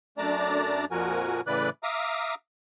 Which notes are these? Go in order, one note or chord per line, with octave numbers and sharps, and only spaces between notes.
F#2 A3 D4 D5 A5 A#5
F2 A#2 F3 F#4 A#4 G#5
A2 C#3 E3 B4 D5 F#6
E5 F5 A#5 D6 D#6